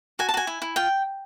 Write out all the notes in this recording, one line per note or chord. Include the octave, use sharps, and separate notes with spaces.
F#4 G#5
A5
F#4 G#5
E4
E4
F4 G5